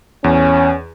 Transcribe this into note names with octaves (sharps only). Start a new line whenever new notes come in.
E2 C#4